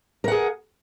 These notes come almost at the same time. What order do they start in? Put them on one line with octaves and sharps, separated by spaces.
A#4 F#5 G#4